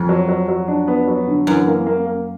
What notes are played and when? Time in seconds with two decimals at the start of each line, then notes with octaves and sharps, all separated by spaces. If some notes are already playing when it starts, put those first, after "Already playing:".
Already playing: F2
0.09 F#3
0.28 F#3
0.48 F#3
0.68 D4
0.88 B3
1.07 F#3
1.27 D3
1.47 F#2 E3
1.67 A#3
1.86 A#3
2.06 A#3